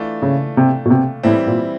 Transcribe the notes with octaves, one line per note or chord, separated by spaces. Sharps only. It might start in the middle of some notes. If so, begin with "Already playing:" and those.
Already playing: E3 A3 D4 F4
C#3
C3
B2
C3
A2 E3 G3 C4 E4
A#2